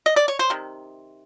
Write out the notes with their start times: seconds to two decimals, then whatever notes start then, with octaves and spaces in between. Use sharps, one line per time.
0.06 D#5
0.16 D5
0.28 C#5
0.39 C5
0.50 C3 D#3